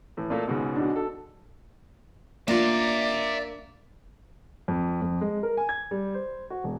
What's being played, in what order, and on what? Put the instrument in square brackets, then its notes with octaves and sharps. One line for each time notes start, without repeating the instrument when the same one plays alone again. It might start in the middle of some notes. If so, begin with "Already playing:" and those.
[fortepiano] A2 E3
A#2 A3 A#3
C#2 G#2 B2
[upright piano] D4 D#4 F#4
[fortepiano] A4
[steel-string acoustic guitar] A#3 [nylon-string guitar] D4 F4 [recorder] D5 [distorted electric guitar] E5 A#5
[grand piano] F2
F2
G#3
A#4
G#5
G#6
G3
C5
F#4
E1